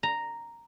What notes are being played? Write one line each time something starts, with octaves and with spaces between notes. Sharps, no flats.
A#5